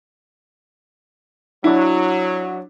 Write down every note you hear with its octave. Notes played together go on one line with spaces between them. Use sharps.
F#3 D4 E4